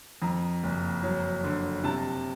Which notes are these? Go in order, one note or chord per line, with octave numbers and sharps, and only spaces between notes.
F2 A#5
F#1
F#3
D3
C3 A5